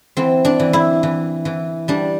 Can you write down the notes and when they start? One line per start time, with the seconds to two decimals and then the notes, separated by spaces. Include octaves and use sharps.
0.17 E3 C4
0.45 D4
0.60 E3
0.73 E4
1.03 E3
1.45 E3
1.88 G3 D4